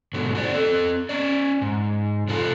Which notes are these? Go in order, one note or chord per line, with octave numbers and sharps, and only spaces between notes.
G#2 B2 D3 F#3
F#4 C5 D5
C4 A4
C#4 D5
G#2
C3 F4 A4 B4 F5